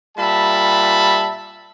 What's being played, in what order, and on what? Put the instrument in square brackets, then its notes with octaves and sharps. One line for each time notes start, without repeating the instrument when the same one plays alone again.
[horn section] A#2 G3 E5 A5 B5